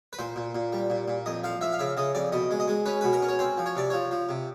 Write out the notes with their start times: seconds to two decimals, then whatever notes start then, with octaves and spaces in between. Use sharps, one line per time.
0.13 B4
0.19 A#2 C5
0.36 A#2
0.55 A#2
0.73 G3
0.90 A#2
1.08 A#2
1.26 F2 D#5
1.44 F3 F5
1.61 F3 E5
1.73 F5
1.79 C#3 E5
1.97 C#3 D#5
2.15 F2 D5
2.32 B2 D#5
2.51 G#3
2.60 D#5
2.68 G#3
2.86 C#4 B4
3.01 B2 B4
3.13 A#4
3.22 C#4
3.29 C#5
3.39 C4 C5
3.58 F3
3.66 C#5
3.76 C3 D5
3.90 F3 C#5
4.11 F3
4.29 C3